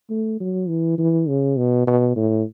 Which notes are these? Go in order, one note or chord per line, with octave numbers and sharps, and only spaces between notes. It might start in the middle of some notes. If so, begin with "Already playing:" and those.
A3
F#3
E3
E3
C#3
B2
B2
A2